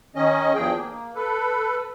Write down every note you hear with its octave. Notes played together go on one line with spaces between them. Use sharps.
D#3 C#4 D#5
E2 G2 F3 G#4 G5
A#3
A4 B4